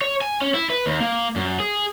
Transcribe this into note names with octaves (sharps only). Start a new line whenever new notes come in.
C#5
G#5
C#4
E4
B4
D#2
A#3
F#2
G#4